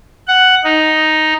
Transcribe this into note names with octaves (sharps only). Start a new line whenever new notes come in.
F#5
D#4